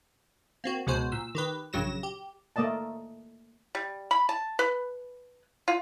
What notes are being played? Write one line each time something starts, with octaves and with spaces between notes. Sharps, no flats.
A#3 C4 F#4
C#2 B2 G#3 F#4 C5
A#2 E6
D#3 G4 B4
A#1 G2 C#3 F#3 A#6 E7
G4
A3 A#3 D5 D#5 A5
G3
B5
A5
B4
F4